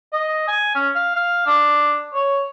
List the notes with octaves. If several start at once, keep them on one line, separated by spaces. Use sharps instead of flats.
D#5
G#5
C#4
F5
F5
D4
C#5